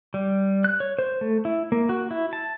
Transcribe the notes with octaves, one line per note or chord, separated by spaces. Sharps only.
G3
F#6
C#5
C5
A3
E4
A#3
F#4
E4
A5